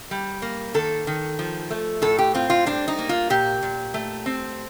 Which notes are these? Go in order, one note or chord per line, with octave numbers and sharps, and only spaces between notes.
G3
A#3
D#3 A4
D#3
F3
A3
A2 A4
G4
C4 F4
F4
G3 D4
D#4
A#3
F4
A#2 G4
A#2
A3
C4